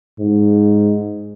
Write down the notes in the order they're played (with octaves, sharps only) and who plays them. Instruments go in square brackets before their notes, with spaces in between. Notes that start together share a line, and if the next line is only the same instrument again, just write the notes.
[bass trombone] G#2